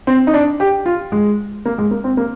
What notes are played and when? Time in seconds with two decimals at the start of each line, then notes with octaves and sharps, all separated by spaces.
0.07 C4
0.27 D#4
0.34 D4
0.60 G4
0.86 F4
1.12 G#3
1.65 A#3
1.78 G#3
1.91 A#3
2.04 C4
2.17 A#3